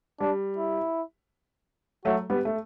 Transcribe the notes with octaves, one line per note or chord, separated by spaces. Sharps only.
G3 D4
E4
F#3 A3 F#4
G3 B3
A3